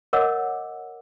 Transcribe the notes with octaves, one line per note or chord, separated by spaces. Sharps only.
A#4 C#5 D#5 F#5 D6 E6